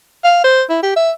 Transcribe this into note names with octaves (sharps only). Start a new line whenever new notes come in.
F5
C5
E4
G4
E5